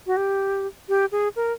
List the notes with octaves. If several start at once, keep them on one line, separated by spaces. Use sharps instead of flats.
F#4
G4
G4
G#4
A#4